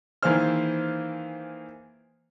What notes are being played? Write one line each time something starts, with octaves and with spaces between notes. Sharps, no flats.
D#3 E3 A#3 G#4 C5 F6